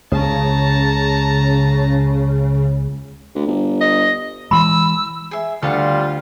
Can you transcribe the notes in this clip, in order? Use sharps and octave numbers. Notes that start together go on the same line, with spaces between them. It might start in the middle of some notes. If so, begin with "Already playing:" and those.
C#2 C#3 A5 A#5
D2
G1
D#5
E3 G#3 B5 C6 E6
G#4 E5
D2 G3 F4 A4 F5 F#5